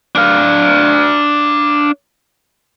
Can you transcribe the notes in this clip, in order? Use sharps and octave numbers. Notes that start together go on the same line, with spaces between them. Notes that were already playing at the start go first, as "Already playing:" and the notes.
D4 F5